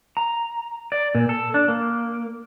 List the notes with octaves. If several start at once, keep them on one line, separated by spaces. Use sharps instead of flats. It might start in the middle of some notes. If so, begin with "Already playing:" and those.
A#5
D5
A#2
A4
D4
A#3